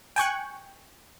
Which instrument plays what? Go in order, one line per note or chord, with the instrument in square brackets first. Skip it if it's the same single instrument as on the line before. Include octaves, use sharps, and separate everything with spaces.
[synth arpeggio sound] G5 G#5 C#6 F#6